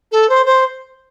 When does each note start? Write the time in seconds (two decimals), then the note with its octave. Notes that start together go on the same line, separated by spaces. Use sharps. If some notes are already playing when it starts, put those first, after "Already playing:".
0.12 A4
0.29 C5
0.46 C5